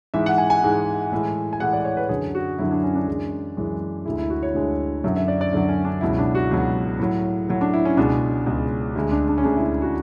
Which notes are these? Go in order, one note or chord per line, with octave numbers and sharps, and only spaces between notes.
G#2 E3 G#3 E5
F#5
G#5
G#5
G#2 E3 G#3
A2 E3 G#3
G#5
A2 E3 G#3 F#5
D5
C#5
B4
F#2 D3 F#3 G#4
F#4
F#2 D3 F#3 E4
D4
C#4
D4
F#2 E3 G#3
F#2 E3 G#3
D2 D3 G#3 E4
E4
F#4
C#5
D2 D3 G#3
F#2 D3 F#3 E5
E5
D5
D5
F#2 D3 F#3
C#4
D4
C#2 B2 F#3 E4
D4
F#4
C#2 B2 F#3
A2 F#3
A2 F#3
D4
E4
C#4
C#2 B2 G#3 D4
C#2 B2 G#3
D2 D3 G#3
D4
D4
C#4
D2 D3 G#3 D4
E4
F#4